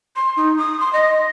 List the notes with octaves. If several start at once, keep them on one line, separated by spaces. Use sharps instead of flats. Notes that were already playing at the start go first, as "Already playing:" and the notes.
C6
D#4
D#6
C6
D#5